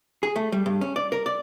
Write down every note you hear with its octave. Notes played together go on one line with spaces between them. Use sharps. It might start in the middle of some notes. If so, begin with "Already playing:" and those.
G#4
A3
G3
G2
C#4
D5
A#4
D5